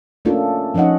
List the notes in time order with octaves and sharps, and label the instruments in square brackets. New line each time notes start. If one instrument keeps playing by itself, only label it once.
[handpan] A3 A#3 C#4 D4 F4 A4
F3 C#4 D#4 D#5 F#5